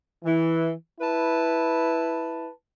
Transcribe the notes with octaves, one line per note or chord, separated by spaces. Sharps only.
E3
E4 B4 A5